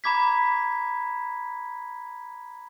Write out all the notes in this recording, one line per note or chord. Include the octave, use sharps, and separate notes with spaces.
A#5 B5 D6 G#6 B6